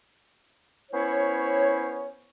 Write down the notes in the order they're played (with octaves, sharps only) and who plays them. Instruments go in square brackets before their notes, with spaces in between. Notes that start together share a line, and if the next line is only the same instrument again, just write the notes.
[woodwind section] B3 C#4 E4 C5 C#5